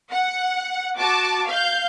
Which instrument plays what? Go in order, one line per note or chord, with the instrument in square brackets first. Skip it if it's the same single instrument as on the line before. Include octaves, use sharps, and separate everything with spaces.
[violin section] F#5
F#4 A5 D6
F5 G6